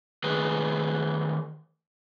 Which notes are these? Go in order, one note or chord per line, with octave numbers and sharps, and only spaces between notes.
D#3 A3 G#4 B4